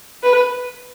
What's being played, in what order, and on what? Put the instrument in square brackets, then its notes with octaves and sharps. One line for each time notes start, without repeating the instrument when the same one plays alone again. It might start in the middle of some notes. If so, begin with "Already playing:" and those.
[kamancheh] B4